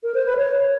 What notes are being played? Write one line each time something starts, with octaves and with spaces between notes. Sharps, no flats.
A#4
C5
B4
C#5